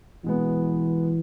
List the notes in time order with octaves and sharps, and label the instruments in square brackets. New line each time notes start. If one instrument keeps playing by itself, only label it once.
[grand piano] B2 G#3 B3 [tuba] E3